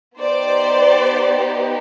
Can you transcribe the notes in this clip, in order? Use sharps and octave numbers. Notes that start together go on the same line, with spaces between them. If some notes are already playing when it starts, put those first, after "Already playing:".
B3 D#4 G4 C5 D5